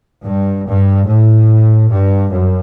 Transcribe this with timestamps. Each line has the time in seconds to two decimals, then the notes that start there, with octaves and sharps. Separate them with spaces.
0.23 G2
0.65 G2
1.06 A2
1.90 G2
2.30 F#2